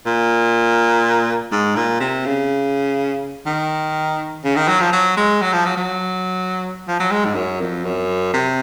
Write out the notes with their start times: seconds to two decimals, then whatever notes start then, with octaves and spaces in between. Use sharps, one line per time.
0.06 A#2
1.51 G#2
1.76 A#2
2.00 C3
2.26 C#3
3.46 D#3
4.44 C#3
4.56 D#3
4.68 F#3
4.81 F3
4.93 F#3
5.17 G#3
5.42 F#3
5.53 F3
5.66 F#3
5.77 F#3
6.88 F3
6.99 F#3
7.11 G#3
7.25 G#2
7.35 F#2
7.60 F2
7.85 F#2
8.34 C3